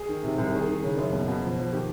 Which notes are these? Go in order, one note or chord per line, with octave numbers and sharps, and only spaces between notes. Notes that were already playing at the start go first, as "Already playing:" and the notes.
Already playing: G#4
D#3
C3
C2
D#3 G#4
D#3
C#3
F#2
B2
B2
F3
F3
D#3 G4